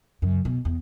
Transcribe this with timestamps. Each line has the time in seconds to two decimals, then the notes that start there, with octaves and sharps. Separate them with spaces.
0.22 F#2 C#3
0.45 B2
0.65 E2